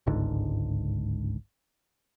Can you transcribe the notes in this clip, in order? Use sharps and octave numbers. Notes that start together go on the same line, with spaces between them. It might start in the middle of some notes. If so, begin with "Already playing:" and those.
G1 C#2 G#2 D3